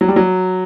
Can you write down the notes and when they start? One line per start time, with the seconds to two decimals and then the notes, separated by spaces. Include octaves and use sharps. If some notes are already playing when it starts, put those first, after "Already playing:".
0.01 F#3
0.08 G3
0.16 F#3